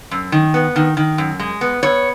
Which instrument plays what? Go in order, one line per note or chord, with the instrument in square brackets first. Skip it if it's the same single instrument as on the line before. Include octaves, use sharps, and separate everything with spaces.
[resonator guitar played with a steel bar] F#2
D#3
B3
D#3
D#3
F#2
G#3
B3
B3 C#5